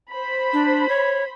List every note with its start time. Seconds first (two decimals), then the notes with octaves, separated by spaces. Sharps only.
0.13 C5 B5
0.53 D4
0.89 C#5